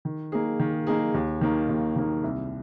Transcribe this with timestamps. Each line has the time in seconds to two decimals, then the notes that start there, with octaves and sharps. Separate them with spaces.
0.05 D#3
0.32 A#3 D#4 G#4
0.60 D#3
0.87 A#3 D#4 G#4
1.14 D#2
1.41 D#3 A#3 D#4
1.69 D#2
1.96 D#3 A#3 D#4
2.24 C2